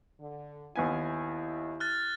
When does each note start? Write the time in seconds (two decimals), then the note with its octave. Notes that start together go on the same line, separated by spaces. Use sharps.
0.20 D3
0.76 D#2 B3 E4 G#5
1.80 F6 F#6 A6